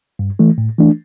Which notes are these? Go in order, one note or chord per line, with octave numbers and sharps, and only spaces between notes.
G2
E3 A3
A2
E3 A3 D4